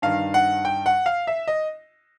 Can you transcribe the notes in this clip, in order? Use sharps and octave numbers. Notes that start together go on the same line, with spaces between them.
G2 D#3 F5
F#5
G5
F#5
F5
E5
D#5